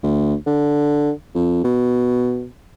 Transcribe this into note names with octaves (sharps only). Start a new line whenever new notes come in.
D2
D3
F2
B2